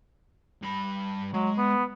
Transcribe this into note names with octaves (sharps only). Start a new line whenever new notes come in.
G2 B5
F#3 G#3
B3